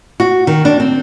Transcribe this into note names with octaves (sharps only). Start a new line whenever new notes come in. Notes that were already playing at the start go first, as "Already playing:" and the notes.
F#4
D#3
D4
C4